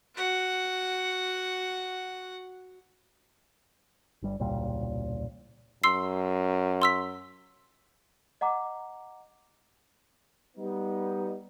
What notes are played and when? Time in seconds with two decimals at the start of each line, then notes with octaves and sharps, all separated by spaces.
0.16 F#4 F#5
4.22 G1 G3
4.40 E1 C#2 A#2 G3
5.84 F#2 C6 E6 C7
6.82 C6 E6 B6
8.41 D#5 F#5 A#5 D6
10.56 G3 B3 D#4